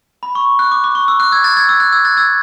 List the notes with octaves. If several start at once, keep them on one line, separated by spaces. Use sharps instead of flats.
B5
C#6
F#6
D6
D6
C#6
E6
F#6
E6 G#6
F#6 A6
E6 G#6
E6 G#6
F#6
E6 G#6
F#6 A6
E6 G#6